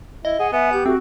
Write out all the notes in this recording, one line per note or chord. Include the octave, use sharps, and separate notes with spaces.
E4 D#5
G#4 F#5
B3 E5 G#5
G4 G6
A3 C4 F#4